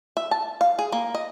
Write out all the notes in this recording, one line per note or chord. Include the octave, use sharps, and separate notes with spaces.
E5
A5
F5
G#4
A#3
D#5